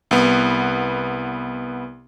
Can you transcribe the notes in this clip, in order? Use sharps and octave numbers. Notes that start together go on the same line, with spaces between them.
C2 B3